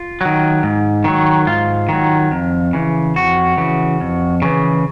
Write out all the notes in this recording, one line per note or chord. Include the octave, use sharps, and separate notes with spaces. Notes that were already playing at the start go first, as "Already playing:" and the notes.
Already playing: F4
D#3 F#3
G#2
D#3 F#3
G#2 F4
D#3 F#3
F2
C#3 E3
F2 F#4
C#3 E3
F2
C#3 E3